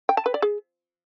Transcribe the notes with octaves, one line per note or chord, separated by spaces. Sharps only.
G5
A5
B4
D5
G#4